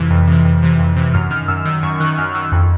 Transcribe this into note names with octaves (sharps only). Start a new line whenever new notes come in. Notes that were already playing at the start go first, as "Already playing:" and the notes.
Already playing: F2 C3 E3 F6
F2
C3 E3
F2
C3 E3
F2
C3 E3
F#2 F6
D#3 F6
F#2 E6
D#3
F#2 C#6
D#3 F#6
F#2 F6
D#3 E6
F2